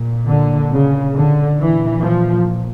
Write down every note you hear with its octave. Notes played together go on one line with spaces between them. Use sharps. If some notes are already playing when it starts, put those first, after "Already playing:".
Already playing: A#2
D3
C#3
D3
A#2 E3
F3